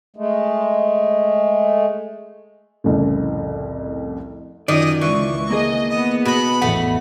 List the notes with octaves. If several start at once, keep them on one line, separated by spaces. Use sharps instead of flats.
G#3 A3
C2 F2 A2 C#3
F#2 D#3 F4 D5 D#5
C#2 E3 C#6
A#3 G#4 D#5
B3 D#5
B2 D#5 B5
A1 E2 A3 B3 F#5